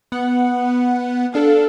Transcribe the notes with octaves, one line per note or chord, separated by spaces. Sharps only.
B3 F#5
D4 A4 F5